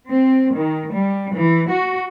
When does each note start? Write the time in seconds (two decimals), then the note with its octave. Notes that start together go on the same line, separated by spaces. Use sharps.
0.10 C4
0.56 D#3
0.93 G3
1.34 E3
1.70 F#4